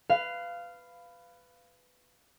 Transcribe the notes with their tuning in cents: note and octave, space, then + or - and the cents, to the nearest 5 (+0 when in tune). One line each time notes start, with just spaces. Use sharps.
B4 +15 F5 -10